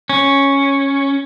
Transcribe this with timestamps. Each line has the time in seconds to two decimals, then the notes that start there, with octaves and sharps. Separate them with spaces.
0.09 C#4